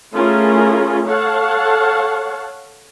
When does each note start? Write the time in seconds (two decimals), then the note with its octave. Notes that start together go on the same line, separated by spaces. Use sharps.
0.13 A3 C#4 E4 F4 G#4 A#4
1.06 A4 C#5 F5 F#5 A5